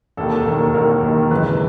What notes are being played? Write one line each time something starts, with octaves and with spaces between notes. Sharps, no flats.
E1 D#2 D#3 A4
E1 D#2 D#3
E1 D#2 D#3 A#4
E1 D#2 D#3
G#1 F#2 C#3 E3 B4